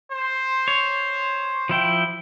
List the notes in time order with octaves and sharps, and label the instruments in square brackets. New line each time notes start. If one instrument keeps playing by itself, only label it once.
[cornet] C5
[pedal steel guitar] C#5
F3 E4 G5